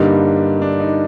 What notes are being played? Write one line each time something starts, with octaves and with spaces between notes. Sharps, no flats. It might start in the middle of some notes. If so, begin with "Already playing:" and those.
Already playing: G2 D3 G3 A#3 D#4
D4
D#4